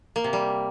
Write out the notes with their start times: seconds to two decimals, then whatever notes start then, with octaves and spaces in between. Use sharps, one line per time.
0.16 A#3
0.24 C3
0.33 G3